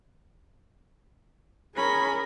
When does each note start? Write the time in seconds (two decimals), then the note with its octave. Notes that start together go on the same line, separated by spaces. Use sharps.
1.76 C#4 G#4 A#4 B5